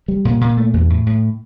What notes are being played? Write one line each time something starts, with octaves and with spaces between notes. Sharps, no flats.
G3
A#2
A#2
A3
E2
A2
A2